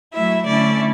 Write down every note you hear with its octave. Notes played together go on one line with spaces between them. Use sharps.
F#3 A3 E4 E5
D3 A3 C#4 E4 D5